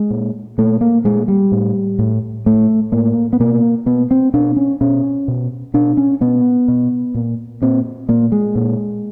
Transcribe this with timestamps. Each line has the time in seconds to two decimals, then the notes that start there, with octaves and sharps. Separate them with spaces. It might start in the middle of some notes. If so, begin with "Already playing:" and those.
Already playing: G#3
0.10 A#2
0.58 A#2 A3
0.81 A#3
1.04 A#2 G#3
1.28 G3
1.52 A2
1.99 A2
2.46 A2 A3
2.92 A2 A#3
3.33 B3
3.40 B2 A#3
3.86 B2 B3
4.11 C4
4.34 B2 D4
4.56 C#4
4.81 B2 C#4
5.28 B2
5.74 B2 D4
5.97 C#4
6.21 B2 B3
6.68 B2
7.15 A#2
7.62 A#2 C4
8.09 A#2 A#3
8.32 G#3
8.55 A#2